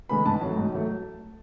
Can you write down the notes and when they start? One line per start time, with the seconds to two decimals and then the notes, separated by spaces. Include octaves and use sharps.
0.09 D3 G#3 B3 B5
0.26 G#2 A5
0.41 F#3 A3
0.57 G#2
0.72 F#3 A3